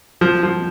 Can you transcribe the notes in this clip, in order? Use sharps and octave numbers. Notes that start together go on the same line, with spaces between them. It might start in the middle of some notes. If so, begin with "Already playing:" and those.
F3
F3